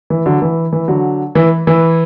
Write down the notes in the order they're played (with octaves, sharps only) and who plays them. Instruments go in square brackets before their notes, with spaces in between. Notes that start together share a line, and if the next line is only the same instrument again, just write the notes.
[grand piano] E3
D3 F#3
E3
E3
D3 F#3
E3
E3